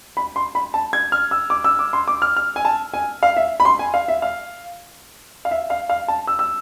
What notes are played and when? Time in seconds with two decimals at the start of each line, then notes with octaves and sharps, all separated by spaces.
0.17 B5
0.36 C6
0.55 B5
0.74 A5
0.93 G#6
1.12 F6
1.31 E6
1.50 D6
1.64 E6
1.79 D6
1.93 C6
2.08 D6
2.22 F6
2.36 F6
2.56 G#5
2.65 A5
2.94 G#5
3.23 F5
3.37 E5
3.60 B5
3.65 C6
3.79 G#5
3.94 F5
4.08 E5
4.22 F5
5.45 F5
5.51 E5
5.70 F5
5.90 F5
6.08 A5
6.27 E6
6.39 E6